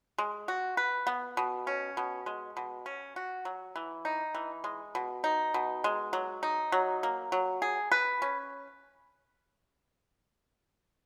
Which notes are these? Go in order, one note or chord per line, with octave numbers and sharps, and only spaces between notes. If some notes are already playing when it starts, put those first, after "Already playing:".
G#3
F#4
B4
B3
B2
C#4
B2
G#3
B2
C#4
F#4
F#3
E3
D#4
E3
G#3
B2
D#4
B2
G#3
F#3
D#4
F#3
A#3
F#3
G#4
B4
C#4